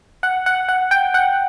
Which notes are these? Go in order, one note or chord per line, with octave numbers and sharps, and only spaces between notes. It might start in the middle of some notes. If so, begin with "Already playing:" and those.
F#5
F#5
F#5
G5
F#5